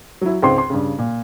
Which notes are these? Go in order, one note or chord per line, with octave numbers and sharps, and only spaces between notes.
F#3 E4
C#2 G#2 C4 C6
C6
G2 C#3
A#2